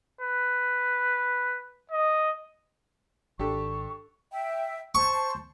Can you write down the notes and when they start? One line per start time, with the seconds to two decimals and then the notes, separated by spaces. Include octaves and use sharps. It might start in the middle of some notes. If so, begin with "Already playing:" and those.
0.21 B4
1.91 D#5
3.39 G#1 D4 G4 A4 C#6
4.32 E5 G5
4.95 C5 A5 C#6